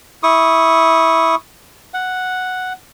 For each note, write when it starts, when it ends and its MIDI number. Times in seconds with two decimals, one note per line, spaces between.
0.23 1.35 64
0.23 1.35 85
0.23 1.35 87
1.94 2.73 78